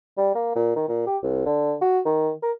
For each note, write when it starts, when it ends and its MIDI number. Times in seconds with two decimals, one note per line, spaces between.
0.18 0.31 55
0.35 0.52 58
0.56 0.71 46
0.76 0.87 51
0.89 1.06 46
1.07 1.17 67
1.23 1.42 36
1.46 1.75 50
1.82 2.00 66
2.05 2.31 51
2.42 2.52 70